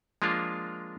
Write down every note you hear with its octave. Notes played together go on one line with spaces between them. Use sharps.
F3 G#3 A#3 D4 F4